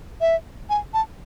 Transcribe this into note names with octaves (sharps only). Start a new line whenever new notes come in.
E5
G#5
A5